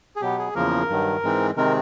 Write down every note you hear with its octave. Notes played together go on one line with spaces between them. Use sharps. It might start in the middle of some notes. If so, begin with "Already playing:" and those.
G#4
B2 F#3 B3 G4
G#4
E2 C#3 F3 A#3 A#4
G2 D#3 F#3
G#2 E3 G#3 C4
C3 D#3 G#3 C4 A#4